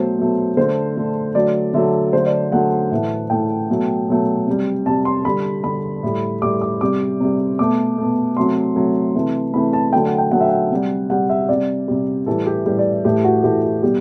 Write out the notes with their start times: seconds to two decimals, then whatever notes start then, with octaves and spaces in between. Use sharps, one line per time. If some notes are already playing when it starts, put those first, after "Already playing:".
Already playing: B2 F#3 A3 C5
0.18 B2 F#3 A3
0.57 D3 A3 C5
0.97 D3 A3
1.35 D3 F#3 A3 D5
1.74 D3 F#3 A3 E5
2.13 D3 F#3 A3 C5
2.26 D5
2.52 D3 F#3 A3 F#5
2.92 A2 E3 A3
3.30 A2 E3 A3 G5
3.69 B2 F#3 A3
4.08 B2 F#3 A3
4.47 C3 G3
4.86 C3 G3 A5
5.05 C6
5.25 D3 G3 B5
5.64 D3 G3 B5
6.03 A2 G3
6.42 A2 G3 D6
6.61 D6
6.81 C3 G3 D6
7.20 C3 G3
7.59 B2 A3 D6
7.98 B2 A3
8.37 C3 F#3 A3 C6
8.76 C3 F#3 A3
9.15 C3 E3 A3
9.54 C3 E3 A3 B5
9.73 A5
9.93 D3 F#3 A3 G5
10.06 F#5
10.18 G5
10.31 D3 F#3 A3 F#5
10.41 E5
10.49 F#5
10.71 C3 G3
11.10 C3 G3 F#5
11.30 E5
11.49 C3 G3 D5
11.88 C3 G3
12.26 A2 E3 G3 A4
12.46 G4
12.66 A2 E3 G3 G4
12.79 D5
13.05 A2 E3 A3 G4
13.24 F#4
13.44 A2 E3 A3 G4
13.63 F#4
13.83 B2 G3 G4